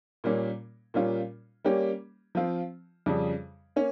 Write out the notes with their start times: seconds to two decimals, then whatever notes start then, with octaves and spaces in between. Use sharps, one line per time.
0.24 A#2 G3 A#3 C#4
0.94 A#2 G3 C#4 F4
1.64 G3 A#3 C#4 G4
2.35 F3 C4 F4
3.06 F2 C#3 G3
3.76 A#3 C#4